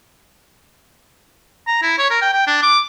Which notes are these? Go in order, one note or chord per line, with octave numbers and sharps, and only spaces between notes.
A#5
E4
C#5
A#4
G5
G5
D4
D6